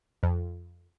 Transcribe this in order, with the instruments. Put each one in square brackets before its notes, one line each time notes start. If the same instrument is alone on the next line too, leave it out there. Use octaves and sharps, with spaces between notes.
[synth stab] F2